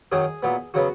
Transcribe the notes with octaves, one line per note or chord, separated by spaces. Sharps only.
F#2 D#3 F#3 G#4
A#2 F#3 B3
C#3 F#3 B3 F#4